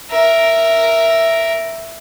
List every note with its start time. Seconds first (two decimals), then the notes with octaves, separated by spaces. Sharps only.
0.11 A#4 E5